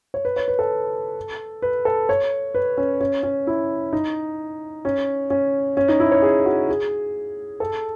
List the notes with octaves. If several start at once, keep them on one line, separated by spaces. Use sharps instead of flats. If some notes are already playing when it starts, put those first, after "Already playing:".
C#5
B4
C#5
B4
A4
B4
A4
C#5
B4
C#4
C#4
C#4
E4
D#4
C#4
C#4
C#4
D#4
E4
C#5
G#4
F#4
G#4
A4